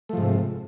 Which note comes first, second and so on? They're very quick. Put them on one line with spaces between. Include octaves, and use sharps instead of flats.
A3 F3 G#2 C3